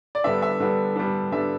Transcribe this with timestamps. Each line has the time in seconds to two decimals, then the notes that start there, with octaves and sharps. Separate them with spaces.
0.15 D5
0.24 D3 G3 B3 D4 E5
0.42 E5
0.60 D3 G3 B3 D4
0.96 D3 G3 B3 D4
1.32 D3 G3 B3 D4 E5